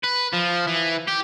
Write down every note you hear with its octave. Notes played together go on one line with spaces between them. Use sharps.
B4
F3
E3
G4